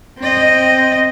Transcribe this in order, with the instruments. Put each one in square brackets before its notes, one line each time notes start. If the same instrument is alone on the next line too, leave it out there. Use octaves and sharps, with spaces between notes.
[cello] C4 D#5